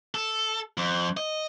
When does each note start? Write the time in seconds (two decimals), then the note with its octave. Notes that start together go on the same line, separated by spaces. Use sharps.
0.15 A4
0.78 F2
1.17 D#5